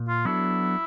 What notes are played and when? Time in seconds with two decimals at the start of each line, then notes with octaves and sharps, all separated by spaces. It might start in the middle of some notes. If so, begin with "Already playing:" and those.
Already playing: A#2
0.08 F4
0.25 F#3 B3 D4 E4 F#4 A4